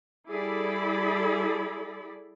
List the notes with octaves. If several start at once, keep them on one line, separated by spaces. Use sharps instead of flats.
G3 E4 G#4 A4 D5 B5